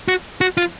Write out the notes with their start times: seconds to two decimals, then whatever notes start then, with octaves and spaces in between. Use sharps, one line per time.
0.08 F#4
0.41 F#4
0.57 F4